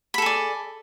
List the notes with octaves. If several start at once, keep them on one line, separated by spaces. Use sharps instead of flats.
G#4 A4 D5 B5